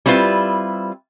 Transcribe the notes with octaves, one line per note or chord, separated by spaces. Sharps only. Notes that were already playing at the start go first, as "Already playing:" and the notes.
G3 C4 E4 F4 B4